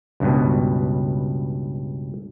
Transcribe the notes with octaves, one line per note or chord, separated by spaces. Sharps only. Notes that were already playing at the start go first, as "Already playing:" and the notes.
C#2 G2 B2